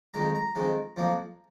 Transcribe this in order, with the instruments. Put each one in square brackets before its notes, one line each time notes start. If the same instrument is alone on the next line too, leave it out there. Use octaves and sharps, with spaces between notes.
[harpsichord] F2 D#3 G#3 A#5
A#5
F2 D#3 G#3
F2 F3 A#3